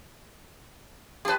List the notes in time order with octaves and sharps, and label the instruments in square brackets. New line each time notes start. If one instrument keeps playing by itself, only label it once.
[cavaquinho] F4 A5 [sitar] G4 B4